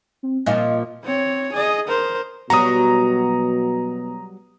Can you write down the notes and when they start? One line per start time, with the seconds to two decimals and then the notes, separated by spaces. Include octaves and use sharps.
0.23 C4
0.46 A#2 F3 F4 D#5
1.03 C4 C#5
1.53 G#4 D#5
1.88 A#4 C5
2.50 B2 F#3 G3 F#4 A#5 D#6